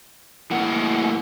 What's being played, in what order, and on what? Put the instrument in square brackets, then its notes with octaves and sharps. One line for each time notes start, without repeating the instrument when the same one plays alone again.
[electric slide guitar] A2 F#5 [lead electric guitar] E3 A#3